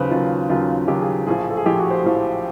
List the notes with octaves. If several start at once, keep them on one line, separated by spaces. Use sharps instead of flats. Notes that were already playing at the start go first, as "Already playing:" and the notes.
Already playing: D#2 C#3 F#3 B4 C5
D#2 C#3 F#3 F4
D#2 C#3 F#3 F4
D#2 C#3 F#3 G4
G#4
A#1 A2 F3 G#4
A4
G#4
A#1 A2 F3 G4
F#4
C5
A#1 A2 F3